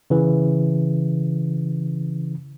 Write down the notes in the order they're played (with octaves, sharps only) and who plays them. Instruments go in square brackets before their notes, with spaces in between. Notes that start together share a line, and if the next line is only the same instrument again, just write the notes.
[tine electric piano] C#3 E3